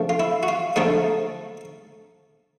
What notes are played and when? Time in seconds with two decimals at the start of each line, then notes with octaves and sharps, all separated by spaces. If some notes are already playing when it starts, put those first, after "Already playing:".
Already playing: C#3 F3 A3 D4
0.09 F4
0.20 E4
0.43 F#4
0.48 F4
0.76 C#3 F3 A3 D4 D#4